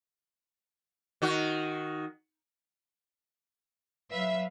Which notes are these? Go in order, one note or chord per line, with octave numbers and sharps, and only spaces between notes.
D#3 F#4
F#3 B4 E5 F5